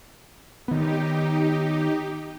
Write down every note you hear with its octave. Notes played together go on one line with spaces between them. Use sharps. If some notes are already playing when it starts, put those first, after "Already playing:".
D#3 B3 D#4 G4